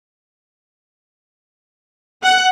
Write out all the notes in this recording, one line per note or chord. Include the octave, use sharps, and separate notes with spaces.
F#5